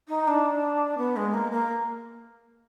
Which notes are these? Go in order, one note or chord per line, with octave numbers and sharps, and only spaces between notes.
D#4
D4
B3
G#3
A#3
A#3